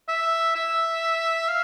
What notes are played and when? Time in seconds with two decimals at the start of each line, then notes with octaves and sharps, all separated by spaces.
0.08 E5
0.55 E5
1.48 F5